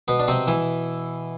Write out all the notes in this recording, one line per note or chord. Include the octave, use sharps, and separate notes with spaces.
B2 B3
D4
C3 C4
E3 E4